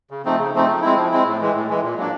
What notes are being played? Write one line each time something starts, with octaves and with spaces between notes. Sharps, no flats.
C#3
F3 A3 C4 D#4
C#3
F3 A3 C4 D#4
F3
G#3 C4 E4
F3
G#3 C4 E4
A2
E3 G#3
A2
E3 G#3
A#2
F#3 A#3 D4